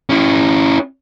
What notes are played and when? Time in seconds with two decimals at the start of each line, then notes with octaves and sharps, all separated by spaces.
0.10 C#4 E4